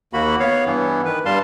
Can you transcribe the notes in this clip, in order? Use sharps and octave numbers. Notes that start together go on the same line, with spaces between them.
D#2 A#3 F#4 B5
B3 C#5 F5
G2 E3 B3
D#3 B4
G2 G3 F5 A5 C6